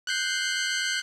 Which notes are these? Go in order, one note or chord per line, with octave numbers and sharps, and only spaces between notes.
F#6 G6 C7